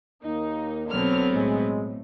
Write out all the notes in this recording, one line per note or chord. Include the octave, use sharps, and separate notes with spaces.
D#2 A#3 D#4
B1 D3 F#3 B3 C4 F6
A2 G#3